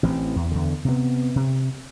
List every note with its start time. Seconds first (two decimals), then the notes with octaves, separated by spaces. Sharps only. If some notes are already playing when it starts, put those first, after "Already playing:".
0.03 A1 E3 C4
0.36 E2
0.52 E2 D3
0.85 C3 B3
1.36 C3